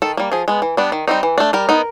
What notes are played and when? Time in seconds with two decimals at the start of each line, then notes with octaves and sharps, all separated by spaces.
0.02 D#3 A4
0.17 G3 A#3
0.32 F3 G#4
0.48 G#3 B3
0.62 E3
0.77 G3 B3 D4
0.92 D#3
1.08 G3 C4 D#4
1.23 E3
1.38 A3 D4
1.53 G3 A#4
1.69 B3 D#4